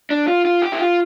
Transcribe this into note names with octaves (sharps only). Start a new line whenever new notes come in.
D4
F4
F4
G4
E4
F4